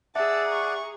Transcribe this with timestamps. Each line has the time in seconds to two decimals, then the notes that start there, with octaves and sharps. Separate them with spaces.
0.15 G#4 D5 E5 F#5 A5 E6
0.48 A#5 C#6